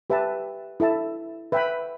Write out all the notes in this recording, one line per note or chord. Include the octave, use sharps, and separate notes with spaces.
G4 B4 E5 A5
E4 A4 E5 A5
B4 E5 G5 B5